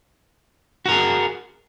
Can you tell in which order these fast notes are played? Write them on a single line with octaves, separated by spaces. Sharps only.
F#4 A#4 G#4